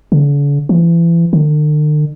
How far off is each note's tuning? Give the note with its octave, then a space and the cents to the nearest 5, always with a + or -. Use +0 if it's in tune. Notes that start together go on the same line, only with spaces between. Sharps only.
D3 -45
E3 +35
D3 +45